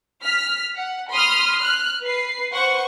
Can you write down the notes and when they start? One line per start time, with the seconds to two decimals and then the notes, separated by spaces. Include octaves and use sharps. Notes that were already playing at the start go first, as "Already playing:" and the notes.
0.23 F6 B6
0.77 F#5
1.11 B5 C6 D#6 F6
1.59 F6 F#6
2.02 B4 C7
2.53 B4 C5 F#5 C#6